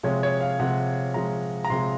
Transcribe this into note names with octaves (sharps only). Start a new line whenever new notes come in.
C3 F3 G#3 C#5
C#5
F5
C3 F3 G#3 F#5
C3 F3 G#3 A#5
A#5
C3 F3 G#3 C6